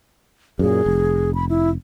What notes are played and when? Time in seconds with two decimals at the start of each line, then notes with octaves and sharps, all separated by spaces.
0.59 F#2 A#2 G#4
0.86 F1
1.35 B5
1.49 E4